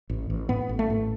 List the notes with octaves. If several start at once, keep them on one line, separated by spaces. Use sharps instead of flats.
A1
A1
A2 B3
A1
A3
A2